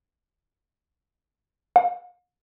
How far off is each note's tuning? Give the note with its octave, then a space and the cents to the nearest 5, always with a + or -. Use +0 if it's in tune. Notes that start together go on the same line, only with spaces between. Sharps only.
F5 +45